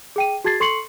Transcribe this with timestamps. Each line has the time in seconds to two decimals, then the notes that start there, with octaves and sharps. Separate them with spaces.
0.16 G#4 G5 D#7
0.44 F#4 G#4 A5 G#6 A6 C7
0.60 A4 C6 C#6 C7 C#7 F#7